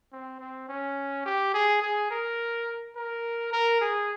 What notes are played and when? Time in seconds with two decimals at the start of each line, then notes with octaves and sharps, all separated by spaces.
0.12 C4
0.40 C4
0.69 C#4
1.26 G4
1.54 G#4
1.82 G#4
2.10 A#4
2.96 A#4
3.53 A#4
3.81 G#4